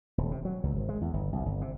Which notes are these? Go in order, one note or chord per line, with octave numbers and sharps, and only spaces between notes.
D#1
C3
F#3
C#2
G#1
G#3
E2
G1
C2
G1
C3